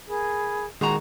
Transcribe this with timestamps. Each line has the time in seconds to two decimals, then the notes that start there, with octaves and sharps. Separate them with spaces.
0.08 G#4 A#4 B5
0.81 A#2 D#3 G#3 F#4 G#4 A#5